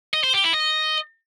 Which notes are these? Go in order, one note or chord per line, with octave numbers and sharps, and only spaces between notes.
D#5
C5
G4
E4
D#5